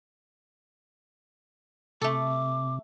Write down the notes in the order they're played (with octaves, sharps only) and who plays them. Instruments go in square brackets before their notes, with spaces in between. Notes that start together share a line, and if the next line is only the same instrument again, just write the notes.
[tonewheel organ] C3 [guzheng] A3 A4 [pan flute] D6